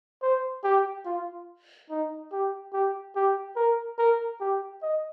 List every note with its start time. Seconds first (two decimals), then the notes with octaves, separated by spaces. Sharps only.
0.22 C5
0.64 G4
1.05 F4
1.90 D#4
2.32 G4
2.73 G4
3.15 G4
3.56 A#4
3.98 A#4
4.40 G4
4.82 D#5